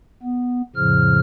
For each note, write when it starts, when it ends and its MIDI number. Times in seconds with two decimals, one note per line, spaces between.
0.23 0.62 59
0.76 1.20 41
0.76 1.20 45
0.76 1.20 49
0.76 1.20 53
0.76 1.20 89